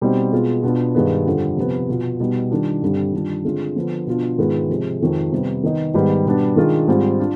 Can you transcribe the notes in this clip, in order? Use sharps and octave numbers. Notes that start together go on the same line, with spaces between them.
B2 G3 C4 D#4
B2 G#3 B3 F4
B2 B3 D4 F4
G2 D#3 G#3 B3
F2 D3 G3
C3 F3 B3
B2 B3 F4
B2 G3 B3 D#4
D#3 G3 D4 F4
G2 D3 G3 C4
D#3 G3 D4 F4
D3 G#3 C4 F4
D3 F3 B3 D4 F4
B2 B3 D4 F4
G#2 D#3 G#3 B3 F4
C3 F3 G#3
F2 D#3 G#3
C3 G3 B3
D#3 B3 D#4
G#2 D#3 G3 B3 D#4
B2 G3 B3 D4
D#3 G#3 D4 F4
G#2 G3 C4 F4
D4 F4